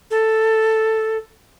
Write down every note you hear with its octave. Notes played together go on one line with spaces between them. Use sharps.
A4